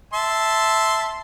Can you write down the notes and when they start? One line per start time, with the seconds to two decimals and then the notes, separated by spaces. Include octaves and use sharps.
0.14 E5 A5 C6